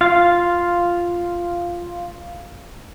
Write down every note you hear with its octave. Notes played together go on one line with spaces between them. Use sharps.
F4 F5